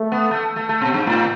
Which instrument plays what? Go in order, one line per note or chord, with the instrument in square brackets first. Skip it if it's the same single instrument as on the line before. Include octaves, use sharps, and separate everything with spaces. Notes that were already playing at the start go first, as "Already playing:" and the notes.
Already playing: [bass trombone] A3
[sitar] B3
A3
A3
A3
B2
G2
A2